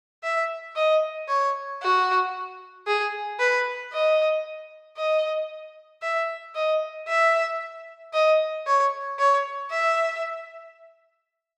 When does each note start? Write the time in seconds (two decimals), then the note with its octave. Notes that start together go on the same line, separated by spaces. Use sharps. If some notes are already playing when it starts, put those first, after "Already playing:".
0.23 E5
0.76 D#5
1.28 C#5
1.82 F#4
2.87 G#4
3.39 B4
3.93 D#5
4.97 D#5
6.02 E5
6.55 D#5
7.08 E5
8.13 D#5
8.66 C#5
9.19 C#5
9.71 E5